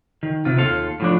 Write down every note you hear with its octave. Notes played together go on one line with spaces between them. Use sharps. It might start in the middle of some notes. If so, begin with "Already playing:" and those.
D#3
C3 F4
D#2 F4 A4 F5
A2 F3 D4